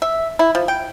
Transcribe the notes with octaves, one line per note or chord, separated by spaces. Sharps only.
E5
E4
F3
G5